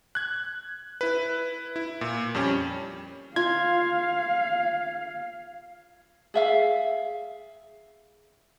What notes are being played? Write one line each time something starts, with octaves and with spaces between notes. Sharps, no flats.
F#6 G#6
E4 B4
E4
A#2
F2 G3 C#4
F4 F5 G#6
G#4 E5 F5